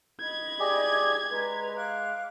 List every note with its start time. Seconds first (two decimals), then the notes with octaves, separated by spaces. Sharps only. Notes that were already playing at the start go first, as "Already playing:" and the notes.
0.21 D#5 B5 G#6
0.60 G4 G#4 D5
1.31 G#3 B4 A#5
1.76 F5 D6 F#6